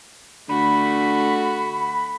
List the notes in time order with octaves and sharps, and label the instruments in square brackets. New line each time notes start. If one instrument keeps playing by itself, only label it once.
[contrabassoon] D3 [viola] A3 F#4 [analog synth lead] B5